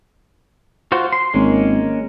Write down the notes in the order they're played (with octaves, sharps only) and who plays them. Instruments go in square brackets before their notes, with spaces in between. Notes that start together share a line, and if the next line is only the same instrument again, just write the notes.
[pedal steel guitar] F4 F#4 C5
C6
[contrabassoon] G#1 [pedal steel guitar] G#3 A#3 C#4